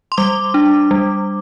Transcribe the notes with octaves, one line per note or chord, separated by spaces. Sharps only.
C6
G3 D6
D4
G3